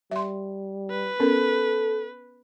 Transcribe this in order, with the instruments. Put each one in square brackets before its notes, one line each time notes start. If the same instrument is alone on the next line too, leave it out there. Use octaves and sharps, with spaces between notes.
[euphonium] G3 [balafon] E5 C6
[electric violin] B4
[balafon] B3 C#4 A#4 [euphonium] A4